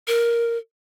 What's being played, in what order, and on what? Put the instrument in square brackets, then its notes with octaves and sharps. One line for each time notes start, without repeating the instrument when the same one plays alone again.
[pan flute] A#4